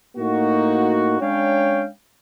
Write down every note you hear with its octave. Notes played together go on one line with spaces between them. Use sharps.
A2 A#3 D#4 F#4
G#3 C#4 D4 C#5 F5 G5